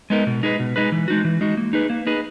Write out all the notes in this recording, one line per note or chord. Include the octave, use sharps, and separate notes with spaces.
G#3 B3 D#4 A#4
B2
G#3 D#4 G#4 B4
B2
G#3 D#4 G#4 B4
E3
G#3 D#4 F#4
E3
G#3 D#4 F#4
A#3
D#4 G#4 B4
A#3
D#4 G#4 B4